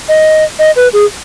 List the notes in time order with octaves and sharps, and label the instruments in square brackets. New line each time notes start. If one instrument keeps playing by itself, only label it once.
[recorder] D#5
D#5
B4
G#4